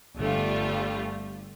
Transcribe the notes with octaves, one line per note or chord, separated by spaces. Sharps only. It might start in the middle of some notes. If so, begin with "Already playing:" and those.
G1 G3 A3 F4